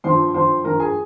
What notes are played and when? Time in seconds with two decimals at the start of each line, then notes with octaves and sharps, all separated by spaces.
0.04 G2 F3 C5 C6
0.34 G2 F3 C5 C6
0.64 G2 F3 A#4 A#5
0.80 G#4 G#5